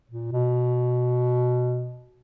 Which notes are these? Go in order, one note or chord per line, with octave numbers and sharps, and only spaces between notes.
A#2
B2